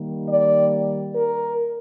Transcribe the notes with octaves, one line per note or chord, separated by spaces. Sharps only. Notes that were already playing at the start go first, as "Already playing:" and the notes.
Already playing: D#3 G3 A#3
D5
A#4